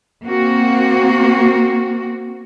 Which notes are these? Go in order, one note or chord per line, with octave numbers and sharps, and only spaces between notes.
A#3 C4 F#4